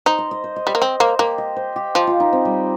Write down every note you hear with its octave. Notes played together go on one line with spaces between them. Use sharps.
D#4 C5
D#5
D#5
C5
D#5
G3 D#5
A#3
C4 D#5
A#3 C5
A#3 G4
D#5
C5
G4
F3 F4
F4
D#4
C4
G3